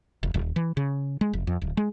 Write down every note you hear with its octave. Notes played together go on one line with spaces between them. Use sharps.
E1
D#1
E3
C#3
G#3
F1
F2
D1
G#3